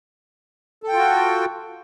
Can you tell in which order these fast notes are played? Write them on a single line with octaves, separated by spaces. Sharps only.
A4 G5 F4 F#4